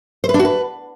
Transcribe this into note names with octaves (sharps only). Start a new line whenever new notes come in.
C5
B4
D4
F#4
B4